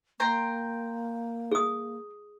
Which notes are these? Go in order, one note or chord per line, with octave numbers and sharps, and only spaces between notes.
A#3 G5 A#5 C6
G#4 D#6